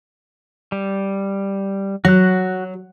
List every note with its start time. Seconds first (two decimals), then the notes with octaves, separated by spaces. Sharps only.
0.72 G3
2.05 F#3 F#4 F#6